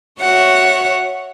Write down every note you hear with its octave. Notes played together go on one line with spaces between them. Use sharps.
F#4 C#5 E5 F#5